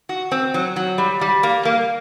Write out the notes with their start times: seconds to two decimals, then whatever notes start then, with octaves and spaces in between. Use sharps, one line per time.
0.09 F#4
0.32 C4
0.54 F#3
0.76 F#3
0.98 G3
1.21 G3
1.43 A#3
1.65 A#3